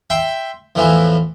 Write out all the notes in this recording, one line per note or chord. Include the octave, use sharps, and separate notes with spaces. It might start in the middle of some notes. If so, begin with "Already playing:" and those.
E5 G5 C6
E2 A2 E3 F3